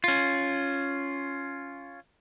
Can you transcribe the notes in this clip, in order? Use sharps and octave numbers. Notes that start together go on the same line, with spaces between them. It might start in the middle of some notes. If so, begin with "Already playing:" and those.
C#4 F4